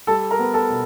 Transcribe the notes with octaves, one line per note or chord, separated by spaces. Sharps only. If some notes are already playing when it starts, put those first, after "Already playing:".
G3 A4 A5
A#4 A#5
B3
A4 A5
B2